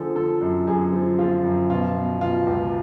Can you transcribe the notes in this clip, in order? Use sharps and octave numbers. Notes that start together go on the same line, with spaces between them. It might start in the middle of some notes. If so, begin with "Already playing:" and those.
Already playing: D3 F3 G#4 A4
F3 A4
F#2
F#2 G#4
F3
F3 F4
F#2
B2 F4
B2
B2 F4
C#2